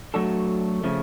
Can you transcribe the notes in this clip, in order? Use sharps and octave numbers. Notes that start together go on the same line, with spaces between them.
F#3 A3 D4 F#4 A4
C#3 F3 A3